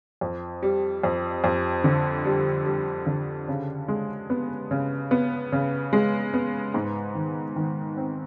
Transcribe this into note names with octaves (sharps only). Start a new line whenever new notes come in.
F2
G3
F2
F2
D3
G3
G3
D3
C#3
G#3
B3
C#3
B3
C#3
G#3
B3
G#2
D#3
D#3
C4